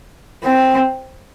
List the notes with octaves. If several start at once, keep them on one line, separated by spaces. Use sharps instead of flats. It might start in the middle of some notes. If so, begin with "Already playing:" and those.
C4